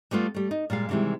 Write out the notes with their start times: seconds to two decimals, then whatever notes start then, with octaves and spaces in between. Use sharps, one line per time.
0.11 G3 A3 B3 F4
0.35 G3 A3
0.51 D#4
0.70 A#2 G3 G#3 F5
0.89 C3 D#3 E3 G3 G#3